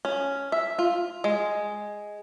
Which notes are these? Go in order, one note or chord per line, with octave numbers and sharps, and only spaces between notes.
C#4
E5
F4
G#3